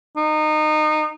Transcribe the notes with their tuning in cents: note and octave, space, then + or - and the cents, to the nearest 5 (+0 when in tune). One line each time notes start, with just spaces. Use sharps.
D#4 -25